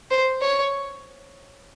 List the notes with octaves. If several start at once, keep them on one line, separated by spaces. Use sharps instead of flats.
C5
C#5